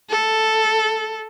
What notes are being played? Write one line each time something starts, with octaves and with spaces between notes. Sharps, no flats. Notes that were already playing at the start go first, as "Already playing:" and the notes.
A4